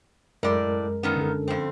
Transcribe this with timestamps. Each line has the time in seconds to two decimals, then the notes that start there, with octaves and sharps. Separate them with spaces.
0.43 F#2 A2 G#3 A#4 D5
1.03 G2 D#3 B3 C#4
1.17 D3 A4
1.48 F2 C4